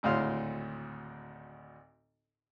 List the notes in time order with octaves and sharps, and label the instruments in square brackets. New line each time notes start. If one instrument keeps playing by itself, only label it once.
[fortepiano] G#1 D2 A2 F5 C6 F6